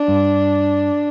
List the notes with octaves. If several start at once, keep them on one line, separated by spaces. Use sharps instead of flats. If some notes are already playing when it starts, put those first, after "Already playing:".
Already playing: D4
G2